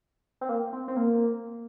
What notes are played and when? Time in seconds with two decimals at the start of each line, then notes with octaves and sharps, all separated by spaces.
0.41 C4
0.49 A#3
0.73 C4
0.88 C4
0.96 A#3